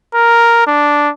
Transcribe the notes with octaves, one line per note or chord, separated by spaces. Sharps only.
A#4
D4